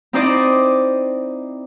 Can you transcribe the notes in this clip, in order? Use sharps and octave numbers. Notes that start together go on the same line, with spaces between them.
C4 D#4 E4 C5 D5 D#5